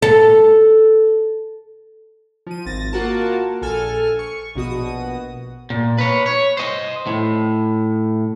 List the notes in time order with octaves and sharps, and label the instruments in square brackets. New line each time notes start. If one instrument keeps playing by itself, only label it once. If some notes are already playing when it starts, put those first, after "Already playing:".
[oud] A4
[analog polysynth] F3 D#7
G#1 A6 A#6
A#3 F4 F#4 A#4 A5
A#1 A4 G#5 F6
C#6
A#1 B2 F#4 D#6
[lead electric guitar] A#2
B4 C#5
C#5
C5 D#5
A2